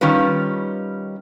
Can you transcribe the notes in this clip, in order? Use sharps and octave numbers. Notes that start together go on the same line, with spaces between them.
D#3 G3 C#4 F4 B4